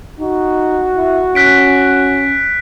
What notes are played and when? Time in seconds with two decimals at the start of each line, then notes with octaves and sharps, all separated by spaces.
0.19 D#4 F#4
0.96 E4
1.35 C#4 F#6 B6 D7